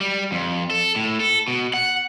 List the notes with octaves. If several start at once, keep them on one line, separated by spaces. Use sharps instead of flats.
G3
F2
A4
A2
A4
B2
F#5